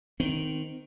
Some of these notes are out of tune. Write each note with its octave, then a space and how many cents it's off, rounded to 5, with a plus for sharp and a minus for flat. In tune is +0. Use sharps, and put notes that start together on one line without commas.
D#3 +0 C4 -25